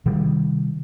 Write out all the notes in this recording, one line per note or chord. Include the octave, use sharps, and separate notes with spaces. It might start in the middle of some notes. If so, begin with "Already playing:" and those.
C3 D#3 G3